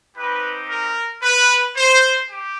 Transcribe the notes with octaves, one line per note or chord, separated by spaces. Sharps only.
C4 D#4 G4 B4
A#4
B4
C5
G4